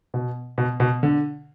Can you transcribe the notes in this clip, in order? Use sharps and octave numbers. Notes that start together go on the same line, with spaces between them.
B2
B2
B2
D3